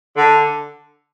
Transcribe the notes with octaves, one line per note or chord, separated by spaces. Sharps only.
D3